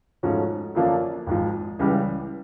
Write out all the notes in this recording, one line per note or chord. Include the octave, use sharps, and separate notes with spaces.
G#2 F3 A3 C#4 F#4
F#2 D3 F3 A#3 D4
G#1 G#2 F3
C#2 C#3 E3 G3